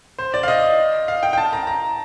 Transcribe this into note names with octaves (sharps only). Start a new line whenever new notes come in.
C5
D5
F5
D#5
F5
G5
G5
A5
A#5
A#5